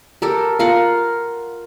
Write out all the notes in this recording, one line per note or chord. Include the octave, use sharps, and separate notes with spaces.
G4 A4 A#4
F4 A#4 F5 F#5